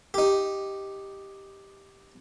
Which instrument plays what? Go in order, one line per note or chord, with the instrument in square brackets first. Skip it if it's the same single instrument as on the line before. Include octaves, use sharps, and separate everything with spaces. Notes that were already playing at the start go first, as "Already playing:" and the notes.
[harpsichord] D#4 G4